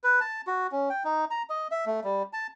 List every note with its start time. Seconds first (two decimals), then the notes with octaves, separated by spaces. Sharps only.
0.04 B4
0.20 A5
0.47 F#4
0.72 C#4
0.90 G5
1.05 D#4
1.31 A#5
1.50 D#5
1.71 E5
1.86 A3
2.04 G3
2.33 A5